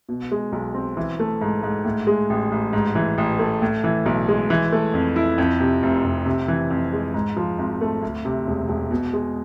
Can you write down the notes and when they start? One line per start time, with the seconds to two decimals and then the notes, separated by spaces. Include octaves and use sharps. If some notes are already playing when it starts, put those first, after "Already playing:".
0.09 B2
0.31 G#3
0.52 B1
0.74 C4
0.97 E3
1.19 A3
1.41 G#2
1.63 G#2
1.85 A2
2.07 G#3
2.30 A1
2.52 A1
2.73 G#2
2.95 E3
3.18 A1
3.39 A3
3.62 A2
3.84 E3
4.06 B1
4.28 G#3
4.50 E3
4.72 A3
4.94 F2
5.16 E4
5.38 F2
5.60 C3
5.83 F1
6.04 F1
6.26 C3
6.48 E3
6.70 F2
6.93 G#3
7.14 G#2
7.37 F3
7.58 G#1
7.81 A3
8.03 D2
8.25 C3
8.47 E1
8.69 E1
8.91 B2
9.13 G#3